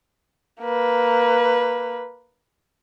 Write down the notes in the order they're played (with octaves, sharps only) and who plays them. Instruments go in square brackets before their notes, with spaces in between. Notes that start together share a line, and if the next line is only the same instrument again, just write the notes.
[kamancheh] A#3 B4